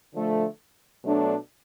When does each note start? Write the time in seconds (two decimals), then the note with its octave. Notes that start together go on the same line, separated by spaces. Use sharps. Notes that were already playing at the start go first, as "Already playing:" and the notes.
0.14 D3 F3 A3
1.04 B2 F#3 A3 D4